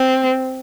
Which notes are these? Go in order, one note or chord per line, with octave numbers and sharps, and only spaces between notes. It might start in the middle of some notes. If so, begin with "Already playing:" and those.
Already playing: C4